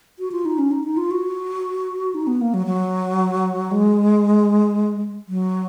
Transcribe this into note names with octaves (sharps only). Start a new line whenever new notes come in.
F#4
F4
D#4
C#4
D#4
D#4
F4
F#4
D#4
B3
A#3
F#3
F#3
G#3
F#3